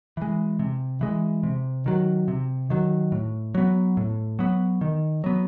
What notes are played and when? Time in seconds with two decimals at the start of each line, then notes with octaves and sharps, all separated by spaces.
0.17 E3 G#3
0.59 C3
1.01 E3 G#3
1.43 C3
1.86 D#3 F#3
2.28 C3
2.70 D#3 F#3
3.12 A2
3.55 F#3 B3
3.97 A2
4.39 F#3 B3
4.81 D#3
5.24 F#3 B3